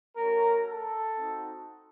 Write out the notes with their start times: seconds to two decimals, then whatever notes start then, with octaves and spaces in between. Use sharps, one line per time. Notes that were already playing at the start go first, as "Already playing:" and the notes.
0.17 A3 C#4 F#4 A#4
0.67 A4
1.16 C4 D#4 F#4